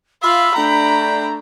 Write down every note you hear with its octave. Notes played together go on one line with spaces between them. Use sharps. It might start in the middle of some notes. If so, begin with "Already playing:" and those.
F4 E5 F5 B5
A3 D4 G5 A#5